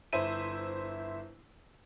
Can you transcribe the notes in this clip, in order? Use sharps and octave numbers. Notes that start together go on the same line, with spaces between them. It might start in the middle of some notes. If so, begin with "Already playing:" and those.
G1 E4 C5 E5 D#7